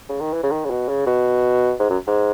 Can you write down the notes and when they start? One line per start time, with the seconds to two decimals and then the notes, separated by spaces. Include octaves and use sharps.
0.09 C#3
0.20 D#3
0.33 E3
0.43 C#3
0.51 D#3
0.64 C#3
0.70 B2
0.88 C#3
1.07 B2
1.79 G#2
1.89 F#2
2.07 G#2